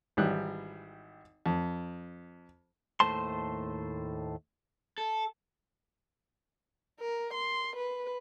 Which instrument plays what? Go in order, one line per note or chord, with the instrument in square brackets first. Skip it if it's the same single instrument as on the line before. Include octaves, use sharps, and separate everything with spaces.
[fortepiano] G#1 E3 G3 F#6
F2
[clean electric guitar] D#2 A2 A3 C5 A5 C6
[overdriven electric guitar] A4
[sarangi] A#4
C6
B4